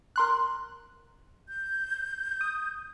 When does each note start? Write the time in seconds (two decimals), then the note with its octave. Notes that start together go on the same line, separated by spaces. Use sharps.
0.16 A#4 C6 F#6
1.48 G6
2.41 D#6